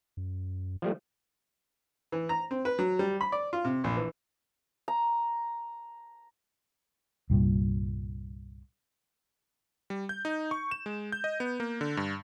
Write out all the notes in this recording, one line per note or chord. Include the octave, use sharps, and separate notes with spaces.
F#2
F3 G3 A3
E3
A#5
C4
B4
F#3
G3
B5
D5
F4
C3
A#1
E3
A#5
C2 G2 A#2
G3
G6
D#4
C#6
E7
G#3
G6
D#5
B3
A#3
D3
G2